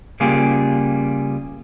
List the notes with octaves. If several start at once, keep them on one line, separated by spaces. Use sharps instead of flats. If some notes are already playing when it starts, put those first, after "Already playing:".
C#3 G3 A#3 F4 G4 G#4